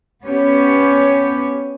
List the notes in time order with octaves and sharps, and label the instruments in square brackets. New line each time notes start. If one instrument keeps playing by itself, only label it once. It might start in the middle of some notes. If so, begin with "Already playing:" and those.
[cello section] B3 C#4 G4 C#5